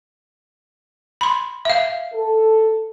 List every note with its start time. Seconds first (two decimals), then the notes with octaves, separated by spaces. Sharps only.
1.21 B5 C6
1.65 E5 F5
2.13 A4